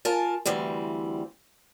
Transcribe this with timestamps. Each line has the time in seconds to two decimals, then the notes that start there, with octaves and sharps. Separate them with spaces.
0.05 F4 A#4 G#5 A5
0.46 D2 E3 G3 C4